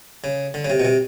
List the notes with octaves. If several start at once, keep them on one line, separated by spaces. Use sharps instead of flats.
C#3
D3
C#3
C3
B2
C3